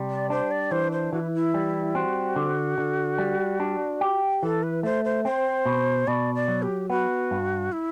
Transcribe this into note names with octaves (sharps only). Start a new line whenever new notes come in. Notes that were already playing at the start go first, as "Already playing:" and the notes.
Already playing: C3 G3
D5
D4 C5
D5
E3 C5
C5
E3 F#4
E4
E4
G3
C4 F#4
D3
D3
G3
D4
G4
E3 A4
B4
A3 C5
C5
C4 C5
B2
B2 D5
D5
F#3
G4
B3 F#4
G2
E4